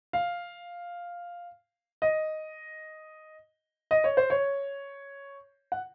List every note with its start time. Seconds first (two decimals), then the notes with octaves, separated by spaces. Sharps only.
0.13 F5
2.02 D#5
3.91 D#5
4.04 C#5
4.17 C5
4.30 C#5
5.72 F#5